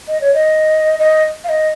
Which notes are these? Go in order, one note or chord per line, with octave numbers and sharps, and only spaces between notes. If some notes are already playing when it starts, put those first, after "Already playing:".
D#5
C#5
D#5
D#5
F5
D#5